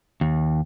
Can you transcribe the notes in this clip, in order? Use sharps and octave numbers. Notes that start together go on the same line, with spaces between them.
D#2